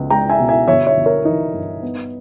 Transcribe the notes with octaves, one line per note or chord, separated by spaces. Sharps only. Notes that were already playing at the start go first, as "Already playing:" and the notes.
Already playing: C#2 B3
G#3 G5 A#5
E5 G#5
B2
E5 G#5
G1 C#5 E5
C#5 E5
G1
A#4 C#5
E3 D#4
G2
B3